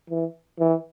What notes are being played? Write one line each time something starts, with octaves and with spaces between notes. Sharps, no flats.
E3
E3